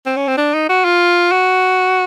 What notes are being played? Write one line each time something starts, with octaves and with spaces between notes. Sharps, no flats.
C4
C#4
C4
D4
D#4
F#4
F4
F#4